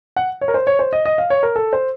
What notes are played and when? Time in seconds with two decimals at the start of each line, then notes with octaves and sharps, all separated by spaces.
0.16 F#5
0.41 C#5
0.48 A#4
0.54 C5
0.67 C#5
0.79 C5
0.93 D#5
1.05 D#5
1.18 F5
1.30 C#5
1.43 A#4
1.56 A4
1.73 C5